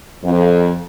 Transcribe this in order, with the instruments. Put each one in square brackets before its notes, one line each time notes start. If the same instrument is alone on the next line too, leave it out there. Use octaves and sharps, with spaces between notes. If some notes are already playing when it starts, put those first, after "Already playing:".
[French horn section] F2